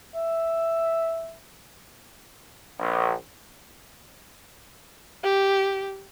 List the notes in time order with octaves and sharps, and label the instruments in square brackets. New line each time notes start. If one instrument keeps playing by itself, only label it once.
[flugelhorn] E5
[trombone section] A#1
[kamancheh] G4